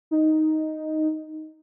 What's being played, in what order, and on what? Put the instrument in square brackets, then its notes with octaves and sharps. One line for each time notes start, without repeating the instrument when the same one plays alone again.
[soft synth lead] D#4